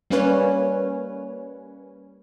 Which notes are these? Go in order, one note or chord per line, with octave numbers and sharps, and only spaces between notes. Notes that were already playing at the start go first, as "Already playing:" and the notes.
G3 A#3 C#4 B4 C#5